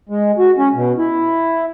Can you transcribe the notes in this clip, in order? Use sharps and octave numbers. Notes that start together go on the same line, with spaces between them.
G#3
F#4
C#4
B2
E4